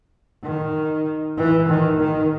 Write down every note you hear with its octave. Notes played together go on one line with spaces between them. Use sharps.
D#3
E3
D#3
D#3